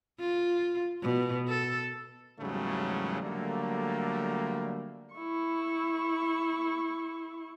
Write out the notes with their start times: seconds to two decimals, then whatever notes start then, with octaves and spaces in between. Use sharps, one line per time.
0.20 F4
1.02 B2
1.48 A4
2.39 E2 G#2 C#3 F#3 G3 A3
3.22 D3 F#3 G3 A3 A#3
5.14 E4 C#6